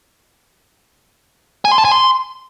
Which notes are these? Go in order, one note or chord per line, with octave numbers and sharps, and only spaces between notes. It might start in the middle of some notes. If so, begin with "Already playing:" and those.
G#5
C6
A5
G#5
C6